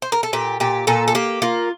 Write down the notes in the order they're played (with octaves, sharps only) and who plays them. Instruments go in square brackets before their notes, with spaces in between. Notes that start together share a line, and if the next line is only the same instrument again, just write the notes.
[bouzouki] C5
A#4
A4
A#2 G4
A#2 G4
A#2 A4
A4
A#3 G4
A#3 F4